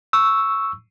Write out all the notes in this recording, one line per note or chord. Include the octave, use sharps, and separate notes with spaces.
C#6 E6